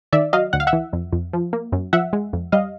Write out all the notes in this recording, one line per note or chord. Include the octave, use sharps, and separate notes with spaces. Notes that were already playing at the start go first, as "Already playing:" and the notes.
D#3 D5 E5
F#3 D#5 F5
D2 F#5
F5
E5 F#5
E3
F2
F2
F3
A#3
F#2
F3 E5 F#5
G#3
F2
G3 D#5 F5